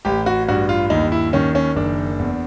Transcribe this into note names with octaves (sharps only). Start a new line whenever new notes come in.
A1 G4
F#4
G2 F#4
F4
D#2 D#4
E4
D#3 C#4
C#4
F#1 D4
E2